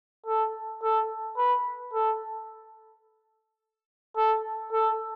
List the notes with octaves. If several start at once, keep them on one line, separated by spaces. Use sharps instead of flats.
A4
A4
B4
A4
A4
A4